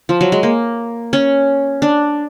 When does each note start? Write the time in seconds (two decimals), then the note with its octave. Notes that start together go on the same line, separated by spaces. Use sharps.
0.09 F3
0.21 F#3
0.32 G#3
0.43 A#3
1.13 C#4
1.82 D4